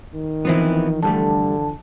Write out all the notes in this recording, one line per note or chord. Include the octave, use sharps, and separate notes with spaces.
D#3
E3 F3 B3 C4 E4
G2 D3 G3 A3 A5